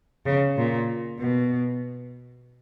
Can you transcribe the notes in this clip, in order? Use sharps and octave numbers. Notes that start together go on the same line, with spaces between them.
C#3
A#2
B2